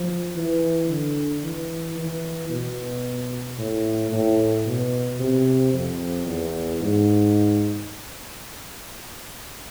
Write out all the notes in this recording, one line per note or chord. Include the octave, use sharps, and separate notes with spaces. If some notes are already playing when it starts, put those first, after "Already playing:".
Already playing: F3
E3
D3
E3
E3
B2
A2
A2
B2
C3
F2
E2
G#2